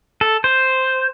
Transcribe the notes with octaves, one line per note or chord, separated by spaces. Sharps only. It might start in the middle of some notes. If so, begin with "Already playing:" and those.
A4
C5